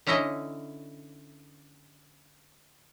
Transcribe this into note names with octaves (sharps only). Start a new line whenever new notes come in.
D3 C#4 D#4 E4 D#5